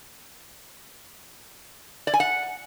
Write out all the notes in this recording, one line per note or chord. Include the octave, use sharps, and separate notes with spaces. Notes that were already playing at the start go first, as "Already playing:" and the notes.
D5
G#5
F#5